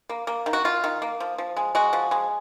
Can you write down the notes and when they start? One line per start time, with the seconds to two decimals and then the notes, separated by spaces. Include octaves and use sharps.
0.09 A#3
0.27 A#3
0.46 D#3
0.53 F#4
0.64 D#3 F4
0.84 D#3
1.02 A#3
1.20 F3
1.38 F3
1.57 G#3
1.75 G#3 F#4
1.93 F3
2.11 G#3